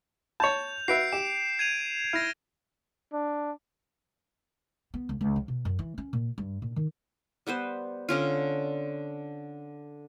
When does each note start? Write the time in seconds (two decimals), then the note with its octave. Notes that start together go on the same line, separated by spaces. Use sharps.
0.40 C#5 A5 G6 F7
0.88 F#4 B4 E5 C7 D7
1.12 G4 E7
1.59 G#6 D#7 F7
2.13 E4 F6 A#6
3.13 D4
4.94 B3
5.09 C#2
5.21 C#2
5.36 F3
5.48 B2
5.65 F#2
5.79 E3
5.98 C#4
6.13 A#2
6.38 G2
6.62 A#2
6.76 D#3
7.47 G3 B3 B4 C5
8.09 D3 C#4 F4